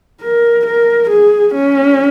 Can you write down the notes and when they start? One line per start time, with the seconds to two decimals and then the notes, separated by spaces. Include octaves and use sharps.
0.22 A#4
0.66 A#4
1.10 G#4
1.55 C#4